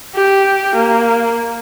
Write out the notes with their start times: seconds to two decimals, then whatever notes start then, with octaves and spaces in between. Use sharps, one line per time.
0.16 G4
0.76 A#3